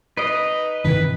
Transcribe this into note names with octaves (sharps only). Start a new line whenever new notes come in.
D#4 B4 D#5 C7 D7
G2 C3 D#3 E3 B4